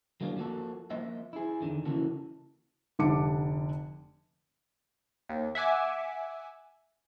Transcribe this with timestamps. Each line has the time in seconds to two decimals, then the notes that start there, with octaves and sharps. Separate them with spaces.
0.21 F#3 G#3 A#3 D4 F4
0.37 F3 A#3 F#4 A4
0.90 F3 A#3 D#5 E5
1.33 E4 G#4
1.61 E2 D3 D#3
1.85 C#3 E3 A#3 F#4 A4
2.99 F1 D3 D4 D6 C#7
5.29 D#2
5.55 E5 F#5 G#5 D6